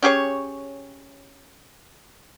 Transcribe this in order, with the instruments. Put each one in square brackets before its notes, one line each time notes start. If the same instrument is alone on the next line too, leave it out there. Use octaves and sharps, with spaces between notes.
[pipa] C#4 G4 G#4 C#5